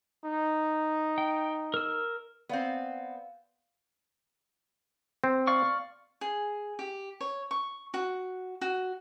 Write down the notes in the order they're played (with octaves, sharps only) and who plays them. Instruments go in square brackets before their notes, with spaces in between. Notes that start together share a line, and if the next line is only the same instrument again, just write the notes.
[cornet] D#4
[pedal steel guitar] G5
A#4 E6
[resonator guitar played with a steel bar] B3 C4 [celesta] D5 F5
[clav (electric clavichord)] C4
[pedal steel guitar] D5 F5 C#6
[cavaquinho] G#4
G4
C#5
C#6
F#4
F#4